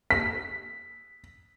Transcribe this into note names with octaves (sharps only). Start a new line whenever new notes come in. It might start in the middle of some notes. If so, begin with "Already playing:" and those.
B6